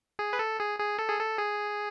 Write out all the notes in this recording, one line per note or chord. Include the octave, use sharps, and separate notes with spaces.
G#4
B4
A4
G#4
G#4
A4
G#4
A4
G#4